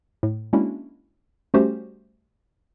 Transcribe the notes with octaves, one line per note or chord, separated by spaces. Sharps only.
A2
G#3 A#3 C#4 D4 E4 F#4
G3 A3 C#4 F#4 G4 C5